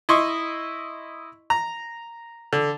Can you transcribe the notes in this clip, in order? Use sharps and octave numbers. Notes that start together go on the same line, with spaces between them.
E4 D#5 C6 C#6
A#5
D3